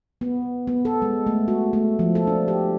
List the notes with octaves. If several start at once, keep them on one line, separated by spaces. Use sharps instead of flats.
B3
B3
A4
G#3
A3
F#4
A3
F3
A4
D4
G4